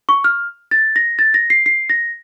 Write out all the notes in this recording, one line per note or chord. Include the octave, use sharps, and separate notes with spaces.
C#6
F6
A6
A#6
A6
A#6
C7
C7
A#6